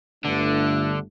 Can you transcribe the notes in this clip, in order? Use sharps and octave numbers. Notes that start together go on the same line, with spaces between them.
G1 G2 D3 A3 D4